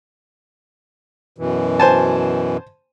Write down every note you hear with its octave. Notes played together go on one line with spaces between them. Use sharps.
F#2 B2 E3
C5 G#5 A5